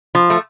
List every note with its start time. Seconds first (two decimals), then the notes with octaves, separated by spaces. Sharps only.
0.15 F3
0.30 A3